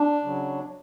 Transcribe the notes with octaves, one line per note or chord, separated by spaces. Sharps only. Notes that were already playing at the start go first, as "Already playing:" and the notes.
Already playing: D4
C#3 F#3